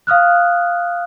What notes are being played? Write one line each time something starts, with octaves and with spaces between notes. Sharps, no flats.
F5 D#6 F6 F#6